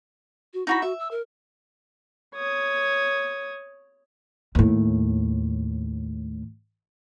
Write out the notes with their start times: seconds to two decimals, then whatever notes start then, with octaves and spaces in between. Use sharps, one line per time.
0.54 F#4
0.67 D#4 E4 F#4 B5
0.82 F#4 E5
1.00 E6
1.11 A#4
2.35 C#5 D#6
4.55 D#2 A2